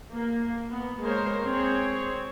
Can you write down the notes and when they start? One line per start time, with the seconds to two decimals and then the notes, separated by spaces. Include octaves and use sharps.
0.12 A#3
0.71 B3
1.03 G#3 A#3 A#4 C5 C#5
1.43 C4 G#4 C#5